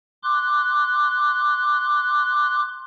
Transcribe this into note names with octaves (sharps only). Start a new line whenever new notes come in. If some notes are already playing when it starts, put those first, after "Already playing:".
C6 D6 F#6